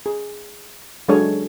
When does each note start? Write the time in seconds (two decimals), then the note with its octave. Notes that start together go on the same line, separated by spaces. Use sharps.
0.06 G#4
1.08 F#3 G#3 D4 G#4 A4 C#5